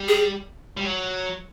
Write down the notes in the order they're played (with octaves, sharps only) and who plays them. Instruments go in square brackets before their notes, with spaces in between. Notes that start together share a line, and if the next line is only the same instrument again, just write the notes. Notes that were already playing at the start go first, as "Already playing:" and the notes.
Already playing: [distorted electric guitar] G3
[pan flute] G#4
[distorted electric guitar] G3
F#3